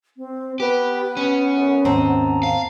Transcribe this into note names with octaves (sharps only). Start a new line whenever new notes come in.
C4
B3 G4 B4
C#4
F#2
D#2 G#2 C4 A5 A#5
F5